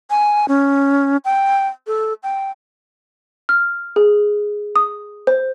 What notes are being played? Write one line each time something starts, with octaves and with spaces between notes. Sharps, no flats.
G#5
C#4
G5
A4
G5
F6
G#4
D#6
C5